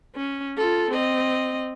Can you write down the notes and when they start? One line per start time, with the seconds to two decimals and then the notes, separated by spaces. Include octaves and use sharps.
0.16 C#4
0.57 F4 A4
0.91 C4 D#5